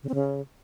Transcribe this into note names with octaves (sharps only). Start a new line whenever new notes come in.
C#3
C4
C#3